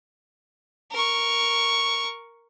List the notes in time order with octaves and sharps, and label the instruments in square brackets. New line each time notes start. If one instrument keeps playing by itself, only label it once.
[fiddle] A#4 C#6